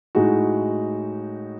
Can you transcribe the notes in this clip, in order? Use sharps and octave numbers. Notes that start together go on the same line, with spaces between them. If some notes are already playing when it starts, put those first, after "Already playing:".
A2 G#3 D#4 F#4